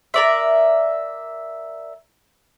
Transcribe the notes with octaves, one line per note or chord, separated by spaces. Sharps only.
A#4 D5 E5